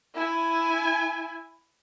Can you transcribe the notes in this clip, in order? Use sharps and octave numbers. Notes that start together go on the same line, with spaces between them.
E4 G#5